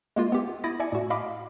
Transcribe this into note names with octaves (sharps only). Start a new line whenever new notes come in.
G#3 A#3 F4
B3 G4
E4 D#6 A6 A#6
D5 E5 G#5 C#7
A2 F#4
D#5 F5 B5 D6